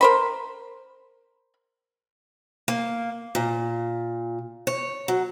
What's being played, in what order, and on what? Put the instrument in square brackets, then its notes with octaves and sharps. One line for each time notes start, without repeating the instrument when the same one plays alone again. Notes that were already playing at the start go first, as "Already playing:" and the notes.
[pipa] A#4 C5 B5
[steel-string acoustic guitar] A#3
A#2
C#5
F#3